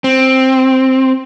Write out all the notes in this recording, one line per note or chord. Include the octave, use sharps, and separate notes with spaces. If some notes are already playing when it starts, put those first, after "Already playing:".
C4